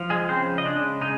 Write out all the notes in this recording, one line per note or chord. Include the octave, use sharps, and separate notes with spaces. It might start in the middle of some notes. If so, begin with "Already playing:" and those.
Already playing: F3
G#3 G#4
C#3 C4 C5
D#5
G#3 D4 D5
C#3 D#4 D#5